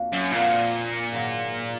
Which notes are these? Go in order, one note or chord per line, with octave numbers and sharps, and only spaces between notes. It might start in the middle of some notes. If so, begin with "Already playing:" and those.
Already playing: F2 F3 A#3 D4 F#4
F#2
F2 A#2 F3 A#3 D4 F#4
G#2 D#3 F#3 A#3